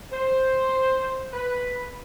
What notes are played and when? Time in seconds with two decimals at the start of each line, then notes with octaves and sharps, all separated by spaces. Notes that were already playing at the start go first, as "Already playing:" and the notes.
0.12 C5
1.32 B4